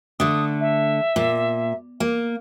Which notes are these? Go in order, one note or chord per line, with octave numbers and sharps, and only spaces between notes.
D3 A3 D#6
E5
A#2
A#3